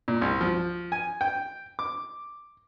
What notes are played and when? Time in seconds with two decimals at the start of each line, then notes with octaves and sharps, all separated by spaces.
0.08 A#2
0.21 C2
0.41 F3
0.92 G#5
1.21 G5
1.79 D6